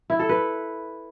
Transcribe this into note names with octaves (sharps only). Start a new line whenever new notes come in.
E4
A4
B4